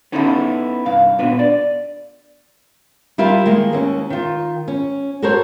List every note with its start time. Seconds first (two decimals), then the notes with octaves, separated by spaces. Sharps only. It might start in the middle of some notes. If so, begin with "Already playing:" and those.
0.12 B3 C#4 D#4 E4 F#4 A4
0.85 C2 G2 F5
1.19 A#2 B3 D4 B4
1.39 D5
3.18 G3 E4 F4 A#4 F5
3.46 D#3 G#3 A#3
3.73 D#2 C#4
4.10 D#3 F4
4.68 C#4
5.22 F#4 A4 A#4 C5 C#5